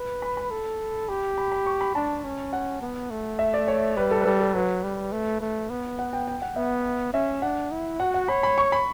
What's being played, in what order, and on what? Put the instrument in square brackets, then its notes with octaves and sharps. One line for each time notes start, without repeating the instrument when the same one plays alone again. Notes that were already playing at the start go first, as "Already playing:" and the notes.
Already playing: [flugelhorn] B4
[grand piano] B5
B5
[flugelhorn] A4
[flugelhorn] G4 [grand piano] B5
[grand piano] B5
B5
C#6
B5
[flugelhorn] D4 [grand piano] A5
[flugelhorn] C#4
[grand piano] F#5
[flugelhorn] B3
A3
[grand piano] E5
D5
C#5
[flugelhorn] G3 [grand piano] B4
[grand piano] A4
B4
[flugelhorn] G3 [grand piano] A4
[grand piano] A4
[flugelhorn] F#3 [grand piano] B4
[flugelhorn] G3
A3
A3
B3
[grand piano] F#5
G5
G5
F#5
[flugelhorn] B3 [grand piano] E5
[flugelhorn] C#4 [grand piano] E5
[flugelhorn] D4 [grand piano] F#5
[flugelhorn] E4
[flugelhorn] F#4 [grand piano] F#5
[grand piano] F#5
[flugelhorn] C#5 [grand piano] B5
[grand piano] B5
C#6
B5